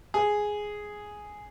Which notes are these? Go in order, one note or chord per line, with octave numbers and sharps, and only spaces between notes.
G#4